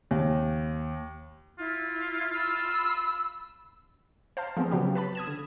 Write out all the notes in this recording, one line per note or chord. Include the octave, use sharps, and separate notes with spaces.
D#2
E4 F4
B5 E6
C5 F5 A5
F3 G#3 B3 C4
C#3 F#3 B3 G4
B4 A5 B5
D#6 G#6 E7
D3